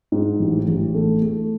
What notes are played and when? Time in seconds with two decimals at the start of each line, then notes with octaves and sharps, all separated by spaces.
0.12 G#2
0.40 A1
0.68 A1
0.94 A3
1.22 A3